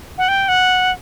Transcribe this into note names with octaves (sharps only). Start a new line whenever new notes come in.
F#5
G5
F#5